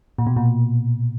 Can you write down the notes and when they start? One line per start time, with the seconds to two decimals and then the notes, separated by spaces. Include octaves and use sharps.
0.18 A#2
0.27 B2
0.37 A#2